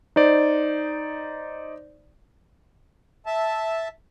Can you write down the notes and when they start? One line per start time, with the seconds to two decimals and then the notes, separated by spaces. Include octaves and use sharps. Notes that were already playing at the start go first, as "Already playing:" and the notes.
0.16 D#4 C5 D5
3.26 E5 A5